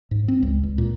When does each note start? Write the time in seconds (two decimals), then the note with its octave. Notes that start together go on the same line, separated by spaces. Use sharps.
0.11 G#2
0.28 C4
0.43 C#2
0.63 C#2
0.78 A#2